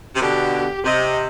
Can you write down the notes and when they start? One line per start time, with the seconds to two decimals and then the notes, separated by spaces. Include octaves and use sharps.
0.16 C3
0.21 B2 D3 G4
0.85 C3 D#5